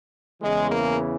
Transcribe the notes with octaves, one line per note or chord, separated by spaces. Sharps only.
E2 C#3 E3 G#3
A#3